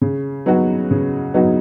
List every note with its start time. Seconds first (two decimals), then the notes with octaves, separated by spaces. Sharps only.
0.01 C#3
0.46 F#3 B3 D#4 F#4
0.91 C#3
1.34 F#3 B3 D#4 F#4